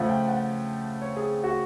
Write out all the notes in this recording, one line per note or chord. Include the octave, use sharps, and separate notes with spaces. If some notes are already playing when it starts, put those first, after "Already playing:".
Already playing: C#3 F3 A3 F#5
G5
F#5
C#5
G#4
F#4